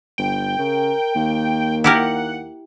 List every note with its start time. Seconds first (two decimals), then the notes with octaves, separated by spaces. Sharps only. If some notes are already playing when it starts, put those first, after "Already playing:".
0.18 G1 G5
0.58 C#3 A#4
1.16 D#2 A#3
1.84 E4 G4 A#4 F#5